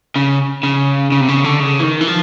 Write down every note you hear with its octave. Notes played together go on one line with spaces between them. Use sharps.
C#3
C#3
C#3
C3
C#3
D3
C#3
E3
D#3
E3
F3